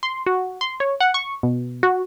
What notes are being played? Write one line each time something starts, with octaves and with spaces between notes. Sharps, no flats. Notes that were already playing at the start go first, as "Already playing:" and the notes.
C6
F#4
C6
C#5
F#5
C#6
B2
F#4